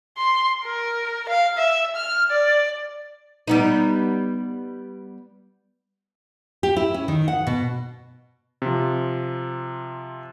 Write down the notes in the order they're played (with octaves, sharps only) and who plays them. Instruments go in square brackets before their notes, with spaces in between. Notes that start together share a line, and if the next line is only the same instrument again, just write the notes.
[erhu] C6
A#4
F5
E5
F6
D5
[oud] G3 B3 D#4
[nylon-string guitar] G4
E4
C#4
D#3
F#5
B2
[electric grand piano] C3 F3